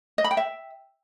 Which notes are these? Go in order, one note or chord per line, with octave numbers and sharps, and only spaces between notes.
D#5
B5
G5
E5